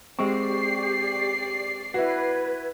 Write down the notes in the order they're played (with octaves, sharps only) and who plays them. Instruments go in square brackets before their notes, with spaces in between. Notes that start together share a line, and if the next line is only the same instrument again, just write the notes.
[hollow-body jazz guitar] G#3 C4 [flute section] G4 [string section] D5 C7 [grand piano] C#6
[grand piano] E4 F#4 [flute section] B4 G#6